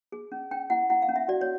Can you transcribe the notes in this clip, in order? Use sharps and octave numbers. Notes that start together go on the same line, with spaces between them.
G#4
C#4
C#4 G5
E4 F#5
E4 F#5
F5
C#4
E5
F#4 D5
C#5